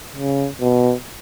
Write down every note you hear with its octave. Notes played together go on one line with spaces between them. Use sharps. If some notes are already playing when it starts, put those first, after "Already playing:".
C#3
B2